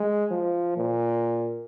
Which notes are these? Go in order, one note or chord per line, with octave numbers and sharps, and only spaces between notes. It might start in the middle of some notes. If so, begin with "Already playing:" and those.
Already playing: G#3
F3
A#2